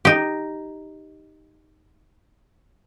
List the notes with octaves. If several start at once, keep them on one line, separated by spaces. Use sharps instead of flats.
D#4 G4